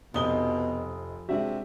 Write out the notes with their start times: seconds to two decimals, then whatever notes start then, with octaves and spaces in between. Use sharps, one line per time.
0.14 F1 B2 F3 D#5 D#6 G7
1.29 C3 G#3 D4 F#4 E5